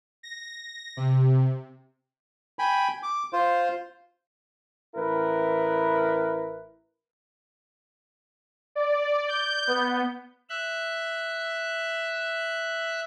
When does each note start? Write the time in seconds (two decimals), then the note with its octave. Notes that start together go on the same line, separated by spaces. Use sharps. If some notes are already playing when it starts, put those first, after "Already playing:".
0.23 A#6
0.97 C3
2.59 G5 G#5 B5
3.03 D6
3.33 F4 C5
4.94 A1 E4 A#4 B4
8.75 D5
9.28 G6
9.67 B3
10.50 E5 F#6